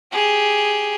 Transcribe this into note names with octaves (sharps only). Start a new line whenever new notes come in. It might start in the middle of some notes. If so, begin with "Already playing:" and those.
G4 G#4